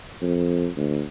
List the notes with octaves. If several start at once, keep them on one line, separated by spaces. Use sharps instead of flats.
F2
D2